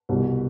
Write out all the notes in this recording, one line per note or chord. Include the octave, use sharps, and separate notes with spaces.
C2 B2